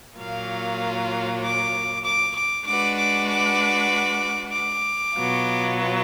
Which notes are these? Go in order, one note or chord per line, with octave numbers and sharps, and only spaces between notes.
A#2 F#3 A#3 F4 F5
D6
D6
D6
G#3 D4 F#4 B4 D6
D6
D6
D6
B2 F#3 B3 F4